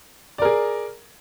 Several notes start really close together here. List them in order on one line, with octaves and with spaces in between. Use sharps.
D5 A#4 G#4